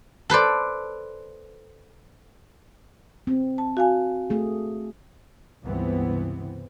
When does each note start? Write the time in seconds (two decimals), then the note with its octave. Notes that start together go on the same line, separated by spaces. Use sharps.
0.30 A4 B4 C5 D5
3.27 C4
3.58 A5
3.77 F#4 F5 G#5
4.30 A3 G#4
5.63 C#2 G2 C3 E3 B3 C4